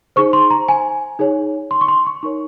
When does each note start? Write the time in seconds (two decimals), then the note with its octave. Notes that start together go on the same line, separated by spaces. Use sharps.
0.16 D#4 G#4 C5 C#6
0.33 C6
0.51 A#5
0.69 G#5
1.19 D#4 G#4 C#5
1.71 C6
1.81 C#6
1.88 C6
2.06 C#6
2.23 D#4 A#4 C#5 C#6